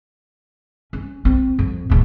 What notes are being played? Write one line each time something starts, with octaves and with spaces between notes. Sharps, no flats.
C#4
C4
F2
D1 E2